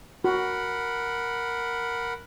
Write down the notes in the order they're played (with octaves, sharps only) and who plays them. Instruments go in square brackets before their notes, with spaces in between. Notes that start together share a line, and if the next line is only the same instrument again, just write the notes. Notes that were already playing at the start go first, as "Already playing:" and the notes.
[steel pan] F#4 [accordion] A#4 F#5 B5